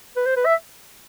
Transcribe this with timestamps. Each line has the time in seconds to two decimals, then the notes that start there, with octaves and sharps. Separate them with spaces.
0.17 B4
0.26 C5
0.36 B4
0.46 E5